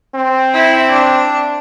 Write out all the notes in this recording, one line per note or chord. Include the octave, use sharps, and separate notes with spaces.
C4
E4
D4